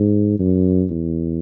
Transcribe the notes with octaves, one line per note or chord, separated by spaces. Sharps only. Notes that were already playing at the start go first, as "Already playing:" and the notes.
Already playing: G#2
F#2
E2